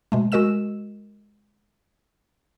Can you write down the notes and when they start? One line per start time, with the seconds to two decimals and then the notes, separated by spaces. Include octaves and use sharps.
0.12 B2 G#3 A3
0.32 G#3 F#4 A#4 D#5 E6 E7